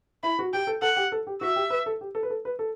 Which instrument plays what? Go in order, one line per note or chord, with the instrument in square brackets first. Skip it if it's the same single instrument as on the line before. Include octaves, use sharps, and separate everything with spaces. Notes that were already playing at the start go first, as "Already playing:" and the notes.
[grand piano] E4 [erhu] B5
[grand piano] F#4
[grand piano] G4 [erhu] G5
[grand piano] A4
[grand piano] A4 [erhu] F#5
[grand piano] G4
A4
G4
[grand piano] F#4 [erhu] E5
[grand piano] G4
B4
A4
G4
A4
B4
A4
B4
A4